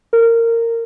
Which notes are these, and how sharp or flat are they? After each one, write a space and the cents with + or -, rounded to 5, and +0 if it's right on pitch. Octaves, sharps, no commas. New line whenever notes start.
A#4 -20